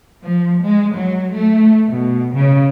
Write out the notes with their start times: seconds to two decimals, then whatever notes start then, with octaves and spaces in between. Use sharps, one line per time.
0.24 F3
0.67 G#3
0.97 F#3
1.36 A3
1.88 B2
2.34 C#3